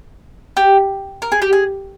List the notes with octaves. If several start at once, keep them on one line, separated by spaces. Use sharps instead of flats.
G4
A#4
G#4
G4
G#4